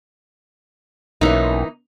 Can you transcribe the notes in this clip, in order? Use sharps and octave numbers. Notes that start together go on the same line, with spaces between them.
B1 E3 A#3 C#4 D#4 C#5